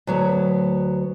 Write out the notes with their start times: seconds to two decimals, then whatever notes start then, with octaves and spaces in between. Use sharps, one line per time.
0.07 D2 F#3 B3